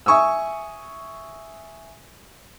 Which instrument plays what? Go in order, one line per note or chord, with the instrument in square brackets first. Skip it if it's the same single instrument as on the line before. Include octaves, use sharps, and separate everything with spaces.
[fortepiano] E5 G#5 C#6 D#6 E6